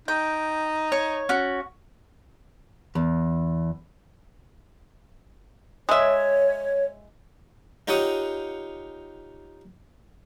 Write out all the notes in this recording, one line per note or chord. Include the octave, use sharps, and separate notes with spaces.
D#4 G5
C#5
C#4 F#4
E2
G#3 C#5 E5
D#4 F4 G4 C#5 F#5 D#6